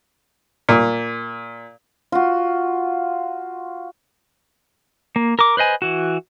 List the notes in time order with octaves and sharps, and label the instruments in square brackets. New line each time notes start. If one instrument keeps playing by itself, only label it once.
[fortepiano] A#2
[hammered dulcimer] F4 F#4
[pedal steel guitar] A#3
A#4 D6
B4 C5 D#5 G#5
E3 F#4